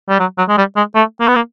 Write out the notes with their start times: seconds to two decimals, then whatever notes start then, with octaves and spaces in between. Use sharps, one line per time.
0.09 G3
0.20 F#3
0.38 F#3
0.49 G#3
0.57 G3
0.77 G#3
0.95 A3
1.20 A#3
1.28 B3
1.35 A#3